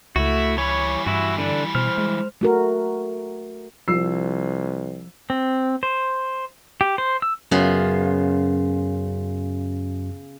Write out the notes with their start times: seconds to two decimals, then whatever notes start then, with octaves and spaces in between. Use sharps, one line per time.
0.16 C#2 A3 E4 F#4
0.58 E3 G3 C#5
1.07 G2 E4 F#4
1.38 D3 D4
1.75 B2 C5 F6
1.98 G#3
2.41 A3 F#4 A#4
3.88 C2 F3 E6 C7
5.30 C4
5.83 C5
6.81 G4
6.98 C5
7.22 E6
7.51 F#2 C#3 B3 F4